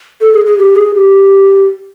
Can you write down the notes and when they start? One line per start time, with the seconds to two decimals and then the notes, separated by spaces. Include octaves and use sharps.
0.21 A4
0.33 G#4
0.46 G#4
0.58 G4
0.76 G#4
0.95 G4